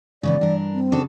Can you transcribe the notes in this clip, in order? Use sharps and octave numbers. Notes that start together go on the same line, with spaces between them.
G#2 C#3 E3 B3 D5
G2 D4 A#4
C4
C#3 D4 F#4 A4